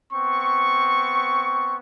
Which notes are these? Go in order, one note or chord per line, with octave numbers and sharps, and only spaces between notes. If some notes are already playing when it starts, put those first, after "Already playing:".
B3 C4 C#6